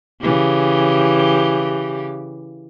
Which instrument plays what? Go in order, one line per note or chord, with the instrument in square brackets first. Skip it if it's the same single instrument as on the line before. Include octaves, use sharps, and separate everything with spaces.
[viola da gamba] C#3 E3 G4